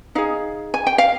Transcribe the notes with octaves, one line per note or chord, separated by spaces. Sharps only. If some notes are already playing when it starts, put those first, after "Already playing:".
D#4 G#4 F5
G#5
G5
F5